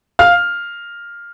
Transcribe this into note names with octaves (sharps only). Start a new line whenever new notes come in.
F5 F6